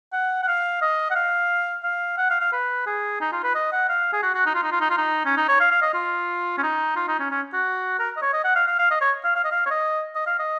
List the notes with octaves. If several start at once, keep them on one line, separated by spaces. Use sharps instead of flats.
F#5
F#5
F5
D#5
F#5
F5
F5
F#5
F5
F5
B4
G#4
D#4
F4
B4
D#5
F#5
F5
G#4
F#4
F#4
D#4
F4
D#4
F4
D#4
F4
D#4
C#4
D#4
C#5
F5
F5
D#5
F4
C#4
D#4
F4
D#4
C#4
C#4
F#4
A#4
D#5
C#5
D#5
F#5
F5
F5
F5
D#5
C#5
F5
F5
D#5
F5
C#5
D#5
D#5
F5
D#5